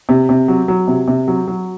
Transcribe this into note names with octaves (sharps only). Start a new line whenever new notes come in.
C3
C3
F#3
F#3
C3
C3
F#3
F#3